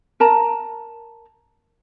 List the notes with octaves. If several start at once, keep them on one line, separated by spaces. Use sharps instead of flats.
A#4 A5 A#5